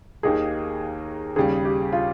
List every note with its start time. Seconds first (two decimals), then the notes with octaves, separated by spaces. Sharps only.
0.23 D#2 D#3 A#3 D#4 G4 G#4
1.36 D#2 C#3 G3 G#4
1.65 G4
1.93 F4